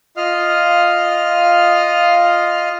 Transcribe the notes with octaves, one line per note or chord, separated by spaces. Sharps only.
F4 D#5 F5 F6